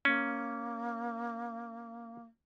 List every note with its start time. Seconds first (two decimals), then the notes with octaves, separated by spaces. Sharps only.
0.05 A#3 C#4